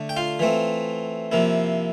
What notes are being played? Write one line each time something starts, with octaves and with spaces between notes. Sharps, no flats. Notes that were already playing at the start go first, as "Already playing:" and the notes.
Already playing: D3 A3 D4
G5
F4 F5
E3 A3 C4
C3 F3 A#3 E4